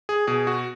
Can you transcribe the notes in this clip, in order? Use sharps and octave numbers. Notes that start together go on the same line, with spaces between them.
G#4
B2 G#4
F#4